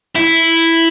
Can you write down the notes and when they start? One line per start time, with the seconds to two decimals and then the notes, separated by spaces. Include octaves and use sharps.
0.16 E4